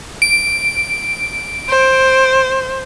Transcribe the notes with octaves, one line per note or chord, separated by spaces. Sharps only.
D7
C5